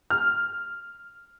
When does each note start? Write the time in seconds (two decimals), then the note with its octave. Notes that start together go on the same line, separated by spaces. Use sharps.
0.10 F6